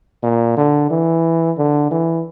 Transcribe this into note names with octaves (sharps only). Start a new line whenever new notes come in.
A#2
D3
E3
D3
E3